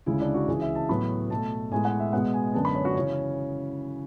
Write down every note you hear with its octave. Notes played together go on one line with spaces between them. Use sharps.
D2 C#3 G#3 E4
D4
F#4
C#2 C#3 E3 G#4
E5
A5
A2 F#3 B3 B5
B2 A3 A5
A2 G#3 B3 G#5
F#5
E5
B2 G#3 B3 F#5
G#5
F#2 D3 G#3 B3 A5
B5
C#5
F#4
C#3 E3 C#4